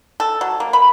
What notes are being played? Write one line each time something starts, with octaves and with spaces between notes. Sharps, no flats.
A4
F#3
A#3
B5